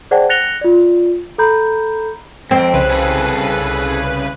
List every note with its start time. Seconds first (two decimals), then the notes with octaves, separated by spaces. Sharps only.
0.11 G#4 C5 D5 F#5 G5 A5
0.29 F#6 A6 A#6 C#7 F7 G7
0.61 F4 D5
1.38 A4 A#5 B5 G6
2.51 F2 C4 D7
2.73 C2 C#3 B4
2.90 G#4 A4